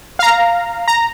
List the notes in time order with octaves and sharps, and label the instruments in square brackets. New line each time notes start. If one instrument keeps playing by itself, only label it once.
[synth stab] F5 A#5
A#5